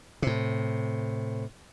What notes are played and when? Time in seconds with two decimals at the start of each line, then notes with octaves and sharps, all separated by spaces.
0.22 A2 C3